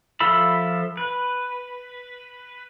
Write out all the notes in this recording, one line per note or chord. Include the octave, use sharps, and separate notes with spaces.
F3 F4 A4 E5 B5
B4